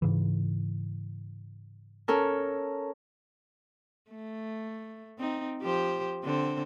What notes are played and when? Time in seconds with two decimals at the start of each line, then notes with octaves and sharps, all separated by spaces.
0.02 G#2 C#3 E3
2.08 C#4 A4 A#4
4.10 A3
5.18 C4 D#4
5.61 F3 G4 C5
6.24 D3 C4 C5